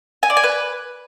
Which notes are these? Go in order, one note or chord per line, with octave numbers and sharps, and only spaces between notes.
G#5
D5
G#5
B4